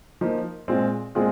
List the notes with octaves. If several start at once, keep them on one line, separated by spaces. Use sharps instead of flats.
F3 A#3 D#4
A#2 G#3 C4 F4
A#2 G#3 C4 F4 G#4